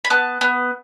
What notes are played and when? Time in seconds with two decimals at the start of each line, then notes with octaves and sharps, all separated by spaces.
0.05 B5
0.10 B3 A5
0.41 B3